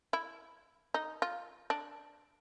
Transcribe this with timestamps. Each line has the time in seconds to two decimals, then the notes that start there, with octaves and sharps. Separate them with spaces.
0.13 E4
0.94 D#4
1.22 F4
1.70 D4